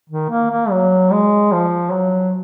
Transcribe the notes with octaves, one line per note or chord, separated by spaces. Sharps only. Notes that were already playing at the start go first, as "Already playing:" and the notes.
D#3
A#3
A#3
F#3
G#3
F3
F#3